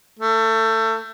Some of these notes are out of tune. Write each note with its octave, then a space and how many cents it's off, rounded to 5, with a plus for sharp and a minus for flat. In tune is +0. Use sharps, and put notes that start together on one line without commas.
A3 +25